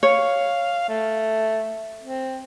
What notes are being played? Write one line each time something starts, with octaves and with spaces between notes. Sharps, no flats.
C#5 F5
A3
C4